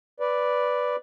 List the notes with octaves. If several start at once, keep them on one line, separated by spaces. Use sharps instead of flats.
B4 D5